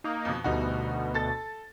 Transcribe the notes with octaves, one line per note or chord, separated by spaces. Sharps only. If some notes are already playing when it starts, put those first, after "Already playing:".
A#3 D#4
F2 B2
D2 B2 G3 D#4 F#4
A4 A6